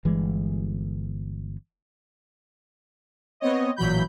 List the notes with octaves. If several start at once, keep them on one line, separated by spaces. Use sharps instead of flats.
G1 E3 G3 G#3
B3 C4 C#5 D#5
A1 A#2 E3 F#3 B5 G6